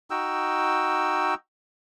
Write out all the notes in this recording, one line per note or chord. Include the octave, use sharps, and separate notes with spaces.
D#4 F#4 G5 E6